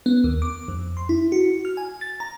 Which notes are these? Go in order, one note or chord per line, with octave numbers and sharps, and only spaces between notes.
B3
D#2
D6
F2
C6
E4
F#4
F6
G#5
A6
A#5